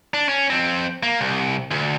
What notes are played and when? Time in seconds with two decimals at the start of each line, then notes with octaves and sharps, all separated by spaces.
0.14 D4
0.29 C#4
0.50 F2 C4
1.03 A#3
1.21 C2
1.71 D2